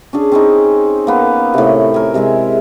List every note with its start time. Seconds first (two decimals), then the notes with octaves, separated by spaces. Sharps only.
0.13 C#4 D4 G#4
0.32 C4 C#4 D#4
1.07 A#3 B3
1.54 A2 C3
1.94 A#4 G#5
2.14 C3 G#3 G#4 E5